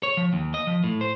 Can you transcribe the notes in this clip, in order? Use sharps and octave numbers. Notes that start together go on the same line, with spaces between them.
C#5
F3
D#2
D#5
F3
A2
C5